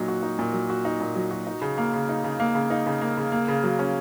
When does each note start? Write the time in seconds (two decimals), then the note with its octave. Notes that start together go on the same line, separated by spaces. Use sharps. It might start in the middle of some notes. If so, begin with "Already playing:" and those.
Already playing: A#2 F#3 D#4
0.08 F#4
0.23 D#4
0.39 A#2
0.53 F#3
0.70 F#4
0.85 D#4
1.00 A#2
1.16 F#3
1.31 F#4
1.47 D#4
1.62 C#3
1.78 A#3
1.93 C#3
2.09 D#4
2.24 C#3
2.40 A#3
2.55 C#3
2.70 D#4
2.86 C#3
3.02 A#3
3.17 C#3
3.32 A#3
3.48 C#3
3.64 F#3
3.79 C#4